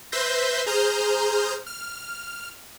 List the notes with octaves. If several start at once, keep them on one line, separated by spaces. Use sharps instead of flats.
B4 C5 E5 C6 G6 A#6
G#4 C5 A#5 D#6 F6 G6
F6